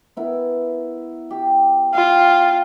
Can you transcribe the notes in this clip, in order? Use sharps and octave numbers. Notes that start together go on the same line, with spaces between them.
B3 E4 A#4
G4
F4 G5